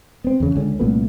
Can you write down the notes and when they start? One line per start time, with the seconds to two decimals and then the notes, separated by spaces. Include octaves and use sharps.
0.24 B3 C4
0.40 E2 C#3
0.55 C#2 D3 C#4
0.79 C2 A#2 A3 B3